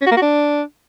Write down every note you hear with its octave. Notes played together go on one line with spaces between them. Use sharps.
C#4
F#4
A#3
F#4
D4